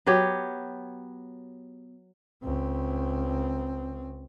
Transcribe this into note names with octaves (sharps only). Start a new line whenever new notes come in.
F#3 B3 G4 C#5
C#2 C4